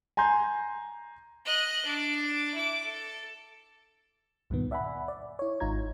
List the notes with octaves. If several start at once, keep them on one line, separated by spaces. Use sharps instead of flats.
G#5 A#5 C6 G6
D#5 F#6
D4 D6
E4 D6
A4
C#2 G2 A#2 D#3 B3
D5 E5 F#5 G#5 B5
D5
E4 C#5
G#1 G#2 D#4 F4 A#5 G#6